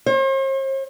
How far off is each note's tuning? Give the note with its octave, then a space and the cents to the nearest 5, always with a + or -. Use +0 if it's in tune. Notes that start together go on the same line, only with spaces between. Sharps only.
C5 +45